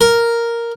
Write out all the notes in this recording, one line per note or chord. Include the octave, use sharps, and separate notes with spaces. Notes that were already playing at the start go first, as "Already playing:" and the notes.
A#4